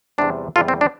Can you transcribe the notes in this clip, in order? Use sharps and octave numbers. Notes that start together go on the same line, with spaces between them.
E2 C3 G3 D4
E2 C3 G3 F4 A4
C4
D4